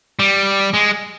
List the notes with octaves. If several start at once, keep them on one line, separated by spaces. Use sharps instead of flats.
G3
G#3